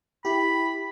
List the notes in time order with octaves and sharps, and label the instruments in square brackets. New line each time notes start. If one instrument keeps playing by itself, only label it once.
[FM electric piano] E4 G4 [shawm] B5